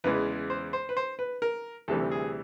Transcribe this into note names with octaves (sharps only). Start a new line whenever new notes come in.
E2 C#3 E3 G#3 B4
C5
C5
B4
C5
B4
A#4
D2 C3 E3 G3 A4
G#4